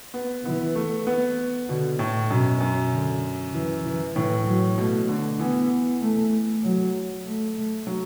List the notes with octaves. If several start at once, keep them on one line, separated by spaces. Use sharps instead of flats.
B3
E3 B3
A3
B3
B2 D3
A2
F#2 B2
F#2
D3
E3
E3
A2 E3
F#3
B2 A3
D3
E3 B3
A3
F#3
A3
F#3